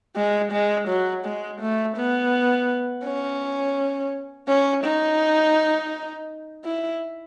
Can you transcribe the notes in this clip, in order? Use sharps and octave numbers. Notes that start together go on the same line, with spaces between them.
G#3
G#3
F#3
G#3
A3
B3
C#4
C#4
D#4
E4